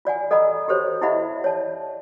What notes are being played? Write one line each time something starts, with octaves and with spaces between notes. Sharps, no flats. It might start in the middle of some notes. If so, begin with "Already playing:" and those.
F4 D5 F#5 G#5
A4 D#5 F#5 A#5 B5 E6
F#4 G4 A4 C5 C#5
E4 G4 D#5 E5 F#5 B5
C#5 D5 A5